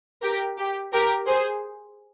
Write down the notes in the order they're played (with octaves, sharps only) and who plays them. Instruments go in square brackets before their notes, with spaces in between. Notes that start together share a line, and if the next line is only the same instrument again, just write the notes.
[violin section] G4 A#4
G4
G4 A#4
G#4 C5